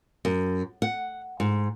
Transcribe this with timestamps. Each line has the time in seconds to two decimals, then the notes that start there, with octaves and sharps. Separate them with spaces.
0.25 F#2
0.82 F#5
1.40 G#2